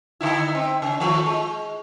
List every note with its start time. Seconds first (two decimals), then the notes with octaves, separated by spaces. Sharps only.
0.21 D3 D#4 E4
0.55 C4
0.82 C#3
1.00 D#3 F3 A3
1.26 G#3